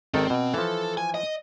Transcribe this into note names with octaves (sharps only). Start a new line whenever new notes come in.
G#1 D#3 C4 A4
B2
E3 F3 A4
G#5
D#5